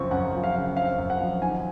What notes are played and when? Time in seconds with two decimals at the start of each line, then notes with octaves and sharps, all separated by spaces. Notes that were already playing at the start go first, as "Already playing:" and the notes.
Already playing: F#2 C#3 F3 C4 C#6
0.11 F#2 F#5
0.33 F3
0.44 F5
0.55 C#3
0.77 C4 F5
0.98 F#2
1.10 F#5
1.20 F3
1.42 D#3 G#5